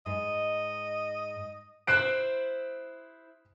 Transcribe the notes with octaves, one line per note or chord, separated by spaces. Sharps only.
G#2 D#5
E4 C5 F#6 C7 D7